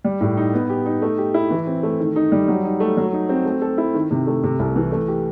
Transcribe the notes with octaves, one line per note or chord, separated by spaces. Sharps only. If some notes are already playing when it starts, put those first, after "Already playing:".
G3
A2
D#4
B3
G4
D#4
A3
G4
E4
E3
C4
A3
D#3
D#4
G3
F#3
D#4
A3
F#3
D#4
C4
A3
A4
E4
D#3
C3
A3
C3
C2
E3
A3
G4